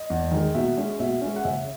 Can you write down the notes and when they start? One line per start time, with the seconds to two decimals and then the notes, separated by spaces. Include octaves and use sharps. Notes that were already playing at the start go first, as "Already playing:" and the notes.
Already playing: D#5
0.10 E2
0.31 D#3 G#3
0.54 B2 E5
0.77 G#3 C#4
1.00 B2 E5
1.21 G#3 C#4
1.36 F#5
1.44 C#3 E5